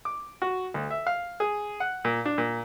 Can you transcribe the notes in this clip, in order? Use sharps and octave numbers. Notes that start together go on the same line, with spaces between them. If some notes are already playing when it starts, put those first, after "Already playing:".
D6
F#4
D2
E5
F5
G#4
F#5
A#2
D4
A#2